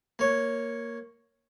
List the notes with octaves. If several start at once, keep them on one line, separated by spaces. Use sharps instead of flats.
A#3 C#5